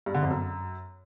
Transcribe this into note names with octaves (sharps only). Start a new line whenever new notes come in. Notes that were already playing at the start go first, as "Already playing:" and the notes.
G2
D3
F2
F#2